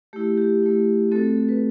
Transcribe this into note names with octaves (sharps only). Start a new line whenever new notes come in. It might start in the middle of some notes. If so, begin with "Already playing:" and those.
A3 E4 G4
G4
A3 E4
A3 C4 F#4 A4
A4
A4
B4